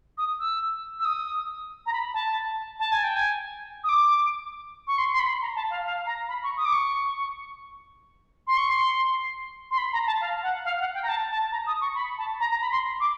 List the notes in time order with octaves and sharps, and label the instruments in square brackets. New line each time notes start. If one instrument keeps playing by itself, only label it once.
[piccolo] D#6
E6
E6
D#6
A#5
B5
A5
A5
G#5
G5
G#5
D#6
D6
C#6
C6
C6
B5
A#5
A5
F5
F5
A#5
B5
C#6
D#6
D6
C#6
C6
C#6
C6
C6
B5
A#5
A5
F5
F#5
F5
F#5
G5
A#5
A5
A5
A#5
D#6
C#6
B5
A5
A#5
A#5
B5
C6
D6